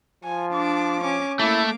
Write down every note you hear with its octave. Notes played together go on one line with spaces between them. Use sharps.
F3 G#5
D4 D6
C#4 D6
A3 A#3 E4 D6